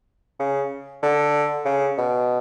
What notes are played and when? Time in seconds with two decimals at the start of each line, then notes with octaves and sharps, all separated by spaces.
0.40 C#3
1.03 D3
1.65 C#3
1.98 B2